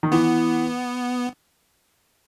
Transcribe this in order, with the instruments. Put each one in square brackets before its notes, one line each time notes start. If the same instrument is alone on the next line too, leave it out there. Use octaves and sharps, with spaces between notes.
[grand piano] D#3
[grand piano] E3 [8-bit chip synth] B3